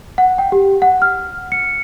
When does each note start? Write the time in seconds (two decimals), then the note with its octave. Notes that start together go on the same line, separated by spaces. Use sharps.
0.18 F#5
0.38 G5
0.52 G4
0.82 F#5
1.02 F6
1.52 C#7